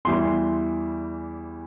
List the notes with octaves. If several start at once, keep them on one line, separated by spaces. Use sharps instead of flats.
E2 E3 G3 C6